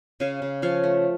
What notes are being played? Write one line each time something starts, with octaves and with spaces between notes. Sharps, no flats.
C#3 C#5 F5
C#3
F3 C#5 F5
A3